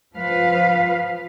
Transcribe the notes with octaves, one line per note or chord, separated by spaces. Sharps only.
F3 B4 F5